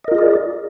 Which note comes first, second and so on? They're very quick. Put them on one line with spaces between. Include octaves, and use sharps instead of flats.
D#5 A#4 F4 G#4 D5